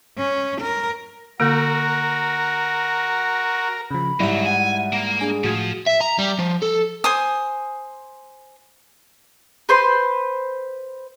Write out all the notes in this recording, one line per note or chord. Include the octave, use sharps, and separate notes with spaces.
C#4
A#4
D3 A#3 F#4 A#4
C#3 F3 B5
G#2 F#3 G3 E4 E5
F#5 G#5
A#3
D4 G#4 G#5
A2 F3 F#4 G#6
E5
A#5
G3
F3
A4
C5 G#5 D#6
B4 C5 C6